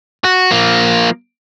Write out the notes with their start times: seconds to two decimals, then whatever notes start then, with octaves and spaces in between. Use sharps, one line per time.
0.24 F#4
0.51 F3 A#3